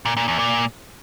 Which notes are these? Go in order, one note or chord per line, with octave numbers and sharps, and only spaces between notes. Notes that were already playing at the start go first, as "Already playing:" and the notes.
A#2
A#2
E2
A#2